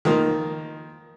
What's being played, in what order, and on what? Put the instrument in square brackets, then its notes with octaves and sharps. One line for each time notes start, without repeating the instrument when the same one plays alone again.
[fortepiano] D#3 F3 A#3